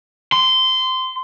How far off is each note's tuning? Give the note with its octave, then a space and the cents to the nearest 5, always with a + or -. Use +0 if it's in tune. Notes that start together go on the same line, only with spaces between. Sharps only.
C6 -20